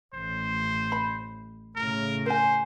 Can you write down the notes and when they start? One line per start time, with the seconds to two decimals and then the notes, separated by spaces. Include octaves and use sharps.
0.14 A1 C5
0.92 B5
1.76 A2 C#3 A#4
2.26 A#4 C5 G#5